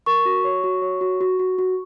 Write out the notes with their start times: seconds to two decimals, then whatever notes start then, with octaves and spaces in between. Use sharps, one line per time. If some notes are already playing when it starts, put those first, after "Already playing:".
0.06 A#4 C#6
0.25 F#4
0.44 C#5
0.64 F#4
0.82 C#5
1.01 F#4
1.21 F#4
1.39 F#4
1.58 F#4